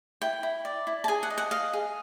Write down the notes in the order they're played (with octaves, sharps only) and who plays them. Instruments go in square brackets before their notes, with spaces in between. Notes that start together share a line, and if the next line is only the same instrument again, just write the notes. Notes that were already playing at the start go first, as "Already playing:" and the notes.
[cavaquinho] E4 G5
E4
D5
E4
A5
G#4 G#5
F#5
D#5
F#5
D#5 F5
G#4